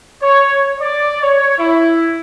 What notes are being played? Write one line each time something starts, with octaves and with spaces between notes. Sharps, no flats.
C#5
D5
C#5
E4